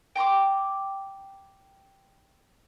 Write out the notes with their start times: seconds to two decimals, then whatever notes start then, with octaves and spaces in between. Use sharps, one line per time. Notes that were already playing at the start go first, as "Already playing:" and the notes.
0.16 G5 A#5 C6 D6